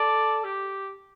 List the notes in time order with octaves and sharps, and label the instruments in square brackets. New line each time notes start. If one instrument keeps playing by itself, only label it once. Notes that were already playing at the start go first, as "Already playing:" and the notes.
Already playing: [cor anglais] A4 [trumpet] D5
[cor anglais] G4